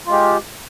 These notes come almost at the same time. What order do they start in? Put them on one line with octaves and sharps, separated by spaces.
F4 G#3 G4